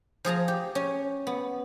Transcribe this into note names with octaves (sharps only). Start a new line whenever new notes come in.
F3 G#4 A5 A#5
G4
C#4
B3